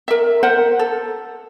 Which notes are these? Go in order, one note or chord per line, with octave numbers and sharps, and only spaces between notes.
A#4 E5
A#4 C5 F#5
A4